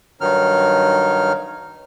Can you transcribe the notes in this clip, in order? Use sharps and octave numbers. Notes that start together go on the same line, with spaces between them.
G2 D#3 F#3 D#4 F6